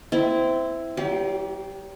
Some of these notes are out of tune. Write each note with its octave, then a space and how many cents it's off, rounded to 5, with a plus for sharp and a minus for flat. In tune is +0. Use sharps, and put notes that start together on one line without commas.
C4 -20 E4 +0
F#3 +45 G4 +0